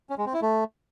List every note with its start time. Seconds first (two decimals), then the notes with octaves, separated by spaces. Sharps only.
0.10 C#4
0.18 G#3
0.26 C4
0.34 E4
0.42 A3